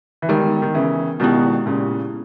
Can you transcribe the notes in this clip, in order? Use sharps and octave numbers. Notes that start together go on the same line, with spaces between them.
E3
D#3 G3 G#3 B3 D#4 A#4
D#3
C#3 E3
B2 D#3 G#3 B3 E4 G4
A#2 C#3